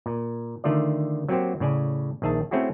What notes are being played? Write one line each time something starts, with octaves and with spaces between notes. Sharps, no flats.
A#2
D3 D#3 A3 F4 D5
F#3 A#3 C4 F#4 G4 C5
A2 C#3 D5 G#5
A#1 D#3 G#4 E5 A5
A3 C4 C#4 E4 F#4 G#4